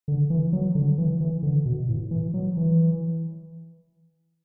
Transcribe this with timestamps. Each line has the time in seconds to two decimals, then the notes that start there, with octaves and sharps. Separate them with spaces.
0.08 D3
0.30 E3
0.53 F#3
0.75 D3
0.98 E3
1.21 E3
1.43 D3
1.65 B2
1.89 A2
2.11 E3
2.34 F#3
2.57 E3